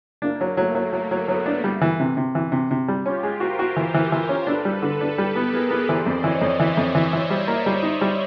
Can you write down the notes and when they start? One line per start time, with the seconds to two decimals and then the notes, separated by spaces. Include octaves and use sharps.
0.22 A#3 D4
0.41 F#3
0.57 F#3 A3
0.75 F#3
0.92 F#3 A#3
1.11 F#3
1.28 F#3 A3 B3
1.46 D4
1.64 G3
1.81 E3
2.00 C3
2.17 C3
2.35 E3
2.52 C3
2.71 C3
2.88 G3
3.05 C#4 F4 G4
3.23 G#3
3.40 F#4 A#4 C5
3.59 F#4
3.76 E3
3.94 E3
4.12 E3
4.29 C#4
4.47 D4 A4 B4
4.65 G3
4.82 D3
5.01 D4
5.17 G3 G4 A4
5.35 B3
5.53 B3 G#4 A#4
5.71 B3
5.88 E3 C5 D5
6.06 F2
6.24 E3 C#5 D#5
6.41 F2
6.59 E3 D5 E5
6.77 F2
6.95 E3
7.13 E3
7.30 G3
7.48 A#3
7.66 G3
7.83 D#4
8.01 G3